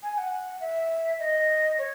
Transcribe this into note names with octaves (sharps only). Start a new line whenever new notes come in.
G#5
F#5
E5
D#5
C#5